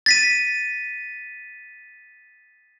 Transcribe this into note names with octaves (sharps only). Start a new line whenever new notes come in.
A6 B6 D#7